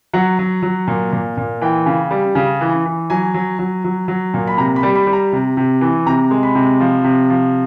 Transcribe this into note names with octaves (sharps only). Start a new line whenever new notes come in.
F#3 F#5
F#3
F#3
A#2
A#2
A#2
E3 G5
C#3
G3
C#3
E3
E3
F#3 G#5
F#3
F#3
F#3
F#3
A#2
B5
C3 A#5
B5
G3
B5
G3
A#5
C3
C3
E3
C3 A#5
G#3
B5
C3
F3
C3
F3